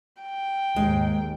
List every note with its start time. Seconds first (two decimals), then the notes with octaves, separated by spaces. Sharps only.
0.22 G5
0.76 D#2 G#2 G#3